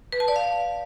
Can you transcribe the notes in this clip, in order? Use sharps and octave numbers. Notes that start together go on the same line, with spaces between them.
B4
A5
D5
F5